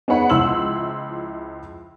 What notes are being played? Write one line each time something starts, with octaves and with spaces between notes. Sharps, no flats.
B3 D#4 G#4 C#5 F#5 B5
C#2 F3 E4 C6 E6 F#7